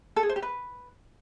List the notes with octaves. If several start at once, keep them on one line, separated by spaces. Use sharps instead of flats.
A4
G#4
C5
G4
B4